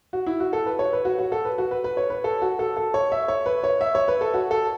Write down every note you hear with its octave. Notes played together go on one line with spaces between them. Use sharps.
F#4
E4
F#4
A4
B4
C#5
B4
F#4
F#4
A4
B4
F#4
B4
B4
C#5
B4
A4
F#4
A4
A4
C#5
E5
C#5
B4
C#5
E5
C#5
B4
A4
F#4
A4